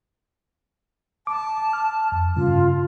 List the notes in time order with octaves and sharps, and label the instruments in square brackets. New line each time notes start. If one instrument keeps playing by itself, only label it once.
[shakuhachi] A5 [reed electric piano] D6
[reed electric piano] F6
F2
[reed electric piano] G2 C#3 [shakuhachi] F4